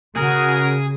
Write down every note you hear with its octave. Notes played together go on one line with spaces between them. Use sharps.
C#3 F#4 G#4 A#4